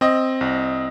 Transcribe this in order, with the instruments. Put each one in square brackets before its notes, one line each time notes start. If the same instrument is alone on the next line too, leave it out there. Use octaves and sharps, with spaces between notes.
[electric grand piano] C4 [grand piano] D#5
[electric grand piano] C2